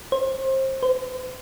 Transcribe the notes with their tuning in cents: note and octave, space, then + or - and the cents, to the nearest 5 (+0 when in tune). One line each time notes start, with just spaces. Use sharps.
C5 +25
C5 -45